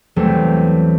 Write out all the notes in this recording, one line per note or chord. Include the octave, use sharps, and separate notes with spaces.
E2 F#3 G3 A3 C4